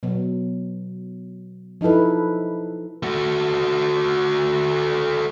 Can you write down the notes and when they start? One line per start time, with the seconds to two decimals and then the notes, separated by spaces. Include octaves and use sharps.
0.03 B2 F#3 B3
1.81 F3 D#4 E4 A4 B4
3.03 A3 F#4